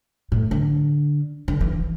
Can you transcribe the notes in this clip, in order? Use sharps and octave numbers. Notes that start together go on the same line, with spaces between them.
A2
D3
D3
E3